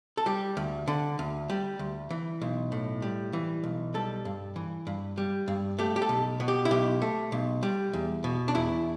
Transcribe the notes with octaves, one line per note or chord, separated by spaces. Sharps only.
A4
G3 G4
D2
D3
D2
G3
D2
E3
B1
A2
G3
E3
B1
G3 A4
G2
E3
G2
G3
G2
A3 G4
G4
A4
B1
B2
G4
E4
B1 G4
A3
B1
G3
E2
B2
D4
E2 E4